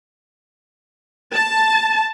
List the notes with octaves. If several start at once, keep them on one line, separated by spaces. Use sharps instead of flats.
A5